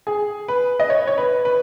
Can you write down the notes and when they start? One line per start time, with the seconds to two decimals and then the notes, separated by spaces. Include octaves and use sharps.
0.07 G#4
0.48 B4
0.80 D#5
0.90 C#5
1.07 C#5
1.18 B4
1.45 B4